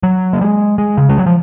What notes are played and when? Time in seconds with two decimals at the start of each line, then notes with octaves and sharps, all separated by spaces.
0.03 F#3
0.33 A#3
0.41 G#3
0.78 G#3
0.98 C#3
1.09 G#3
1.18 F#3
1.27 F3